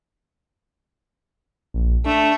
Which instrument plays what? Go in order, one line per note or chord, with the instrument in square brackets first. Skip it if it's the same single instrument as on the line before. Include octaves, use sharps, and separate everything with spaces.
[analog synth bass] A#1
[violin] A3 [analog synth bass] D4